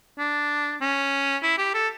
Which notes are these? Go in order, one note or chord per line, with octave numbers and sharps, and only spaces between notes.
D4
C#4
E4
G4
A4